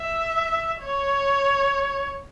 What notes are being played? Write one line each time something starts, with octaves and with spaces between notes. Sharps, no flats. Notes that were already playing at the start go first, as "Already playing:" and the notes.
Already playing: E5
C#5